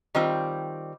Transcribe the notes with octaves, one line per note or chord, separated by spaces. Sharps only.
D#3 G3 C4 F4